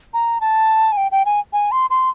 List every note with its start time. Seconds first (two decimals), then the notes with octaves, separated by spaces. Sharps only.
0.14 A#5
0.41 A5
0.92 G#5
0.97 G5
1.12 G5
1.25 G#5
1.53 G#5
1.72 C6
1.90 C6